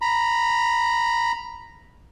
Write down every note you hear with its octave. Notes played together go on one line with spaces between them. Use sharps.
A#5 B5